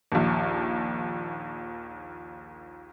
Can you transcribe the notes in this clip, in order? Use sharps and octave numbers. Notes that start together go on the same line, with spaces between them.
A#1 D#2